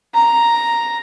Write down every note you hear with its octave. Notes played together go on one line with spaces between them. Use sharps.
A#5